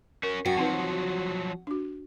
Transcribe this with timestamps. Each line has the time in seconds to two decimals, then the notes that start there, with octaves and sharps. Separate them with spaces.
0.23 C#4 F#4 A#4
0.46 F#2 F#4 G5
0.57 F3 F#3 C4 D#4 B4
1.67 D4 F#4